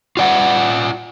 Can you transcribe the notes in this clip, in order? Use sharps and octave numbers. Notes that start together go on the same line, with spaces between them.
F4 D5 F#5